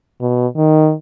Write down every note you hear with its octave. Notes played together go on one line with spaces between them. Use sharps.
B2
D#3